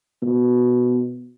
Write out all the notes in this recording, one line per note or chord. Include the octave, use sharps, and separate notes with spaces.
B2